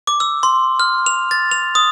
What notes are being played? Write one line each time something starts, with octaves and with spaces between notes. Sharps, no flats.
D6
E6
C6
F6
F7
A6
F7
D#6